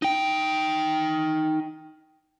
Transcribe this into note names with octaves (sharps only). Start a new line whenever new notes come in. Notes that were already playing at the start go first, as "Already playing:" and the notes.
D#4 G5